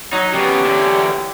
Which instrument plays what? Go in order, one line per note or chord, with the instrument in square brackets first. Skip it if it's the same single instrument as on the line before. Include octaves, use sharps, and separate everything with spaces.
[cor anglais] F#3 [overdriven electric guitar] D#4 [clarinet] C#5
[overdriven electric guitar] C#3 B3 [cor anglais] G4
[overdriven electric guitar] E2 D3